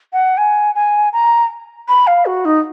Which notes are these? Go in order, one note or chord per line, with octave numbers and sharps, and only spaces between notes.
F#5
G#5
G#5
A#5
B5
F5
F#4
D#4